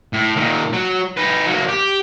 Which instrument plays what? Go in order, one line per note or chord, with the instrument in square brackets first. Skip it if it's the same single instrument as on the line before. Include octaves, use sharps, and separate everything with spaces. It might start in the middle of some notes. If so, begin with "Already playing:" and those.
[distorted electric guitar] A2
A#2 D#3
F#3
D#4 B4
F#3 A#3
G4